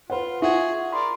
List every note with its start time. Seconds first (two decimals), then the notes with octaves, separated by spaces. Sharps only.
0.10 F4 B4 C5 F#5
0.42 F4 F#4 G#4 E5 F#5 C#6 G#6
0.92 A#4 D5 B5 C6